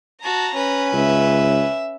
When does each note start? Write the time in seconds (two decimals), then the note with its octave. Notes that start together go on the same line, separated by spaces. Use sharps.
0.23 F#4 A5 A#5
0.54 C#4 B4
0.93 C#2 E5